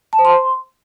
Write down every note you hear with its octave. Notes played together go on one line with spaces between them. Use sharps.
A5
C5
C6